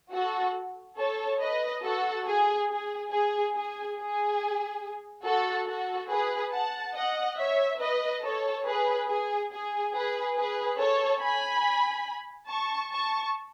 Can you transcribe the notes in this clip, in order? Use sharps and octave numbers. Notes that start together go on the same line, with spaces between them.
F#4 A4
A4 C#5
B4 D#5
F#4 A4
G#4
G#4
G#4
G#4
G#4
F#4 A4
F#4 A4
G#4 B4
F#5 A5
D#5 F#5
C#5 E5
B4 D#5
A4 C#5
G#4 B4
G#4
G#4
G#4 B4
G#4 B4
A4 C#5
G#5 B5
A5 C#6
A5 C#6